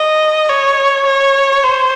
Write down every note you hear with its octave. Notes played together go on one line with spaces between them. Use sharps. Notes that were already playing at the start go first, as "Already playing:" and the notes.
Already playing: D#5
C#5
C#5
C5